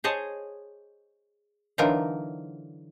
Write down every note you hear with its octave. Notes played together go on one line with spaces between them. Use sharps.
G#4 C5 C#5 D#5 A5
D3 E3 F#3 D#4 F4 A#4